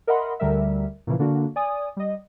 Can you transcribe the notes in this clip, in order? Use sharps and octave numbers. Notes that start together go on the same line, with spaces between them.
A#4 D#5 E5 F#5 B5 C6
D2 D3 G3 A#4 E5
A#2 C#3 E3 F3
D3 A#3 D4 F#4
D5 G#5 D#6
G3 D#5